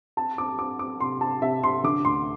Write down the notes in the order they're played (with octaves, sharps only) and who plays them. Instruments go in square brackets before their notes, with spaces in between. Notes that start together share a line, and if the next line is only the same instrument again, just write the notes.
[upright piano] C4 A5
C4 D6
C4 D6
C4 D6
C3 C6
C4 A5
C3 E5
C3 C6
D3 D6
D2 C6